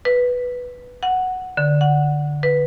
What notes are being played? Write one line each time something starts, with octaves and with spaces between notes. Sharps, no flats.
B4
F#5
D3
F#5
B4